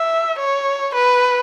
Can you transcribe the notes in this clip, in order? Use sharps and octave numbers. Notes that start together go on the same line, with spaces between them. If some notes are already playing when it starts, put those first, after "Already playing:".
Already playing: E5
C#5
B4